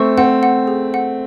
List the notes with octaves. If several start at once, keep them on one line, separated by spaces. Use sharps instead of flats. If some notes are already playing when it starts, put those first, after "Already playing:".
Already playing: A3 C4 C#6
C4 F#5
F#5
G#4
F#5